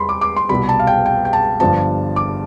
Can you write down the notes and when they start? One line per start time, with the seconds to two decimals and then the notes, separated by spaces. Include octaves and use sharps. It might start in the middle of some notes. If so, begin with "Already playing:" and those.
Already playing: E2 G3 B5 C6
0.09 D6
0.21 D6
0.36 C6
0.49 C2 B2 G3 B5
0.69 A5
0.79 F5
0.87 G5
1.06 G5
1.25 G5
1.33 A5
1.60 G1 G2 F3 A5
2.16 D6